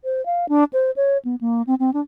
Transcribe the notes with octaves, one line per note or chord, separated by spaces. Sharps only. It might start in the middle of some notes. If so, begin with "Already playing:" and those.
C5
F5
D4
C5
C#5
B3
A#3
C4
C4
D4